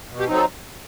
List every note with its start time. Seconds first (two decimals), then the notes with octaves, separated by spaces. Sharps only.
0.11 B2
0.20 G4
0.28 F#3 C4 D#4
0.36 A4